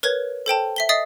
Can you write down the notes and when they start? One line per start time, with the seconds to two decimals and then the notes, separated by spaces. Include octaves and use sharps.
0.03 A#4 B4 C#5 G#6
0.46 A4 C5 G5 A5
0.76 E5 B6 G7
0.89 D#5 E5 D#6 A6 C7